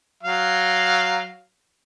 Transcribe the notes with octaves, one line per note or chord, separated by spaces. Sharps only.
F#3 F5